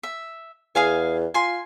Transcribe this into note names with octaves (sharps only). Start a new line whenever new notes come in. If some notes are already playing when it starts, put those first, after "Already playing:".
E5
E2 G#4 F5 G#5
F4 G#5 C6